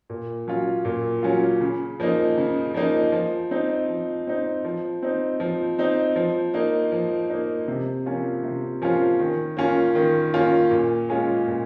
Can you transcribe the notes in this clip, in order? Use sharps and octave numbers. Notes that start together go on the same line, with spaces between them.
A#2
F#3 C#4 F4
A#2
F#3 C#4 F4
C#3
F3 A#3 D#4
C#3
F3 A#3 D#4
F3
C4 D#4
F3
C4 D#4
F3
C4 D#4
F3
C4 D#4
F3
A#3 D#4
F3
A#3 D#4
C3
F3 A#3 C#4 F4
C3
F3 A#3 C#4 F4
D#3
A#3 C#4 F4
D#3
A#3 C#4 F4
A#2
G#3 C#4 F4
A#2